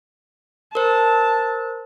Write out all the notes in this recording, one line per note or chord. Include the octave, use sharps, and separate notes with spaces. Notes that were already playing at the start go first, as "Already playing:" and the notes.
A#4 C5 A5